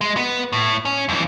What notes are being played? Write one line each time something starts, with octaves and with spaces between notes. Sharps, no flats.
G#3
B3
A2
C#4
F2 E3